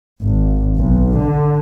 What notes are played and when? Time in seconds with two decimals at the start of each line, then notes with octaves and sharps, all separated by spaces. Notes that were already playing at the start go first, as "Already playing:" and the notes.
0.21 G#1
0.77 B1
1.17 D3